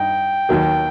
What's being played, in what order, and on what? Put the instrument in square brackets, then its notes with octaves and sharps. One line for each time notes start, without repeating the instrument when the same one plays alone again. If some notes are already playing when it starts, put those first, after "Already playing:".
Already playing: [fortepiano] G2 D#4 [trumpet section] G5
[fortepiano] D#2 D#3 F#3